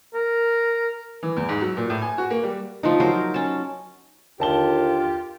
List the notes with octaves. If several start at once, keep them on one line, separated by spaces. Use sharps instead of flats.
A#4
E3
E2
G#2
F#3
A#2
A2
G#5
F#4
A#3
G3
F3 A3 D#4
F#3 A#4 C5
C#4 A5
D#2 D3 F4 G4 A5 G7